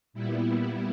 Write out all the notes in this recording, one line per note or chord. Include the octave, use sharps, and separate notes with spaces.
A#2 G3 B3 E4